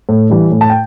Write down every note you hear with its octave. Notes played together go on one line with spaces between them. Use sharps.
A2
E3 G3
A2
A5
G5